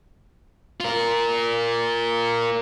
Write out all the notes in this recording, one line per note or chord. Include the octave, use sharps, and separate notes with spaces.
F4 A#4